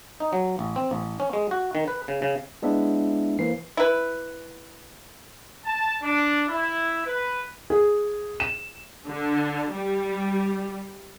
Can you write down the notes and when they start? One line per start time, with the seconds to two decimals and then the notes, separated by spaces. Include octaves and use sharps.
0.20 D#4
0.33 F#3
0.59 A1
0.76 C4
0.91 A1
1.20 C#4
1.33 G#3
1.51 F#4
1.75 D#3
1.88 B4
2.08 C#3
2.22 C#3
2.62 G#3 B3 D4 E4 D5 E5
3.39 E3 A#3 C5 C7
3.77 E4 B4
5.65 A5
6.02 D4
6.48 E4
7.06 B4
7.70 G#4
8.40 E7
9.08 D3
9.73 G3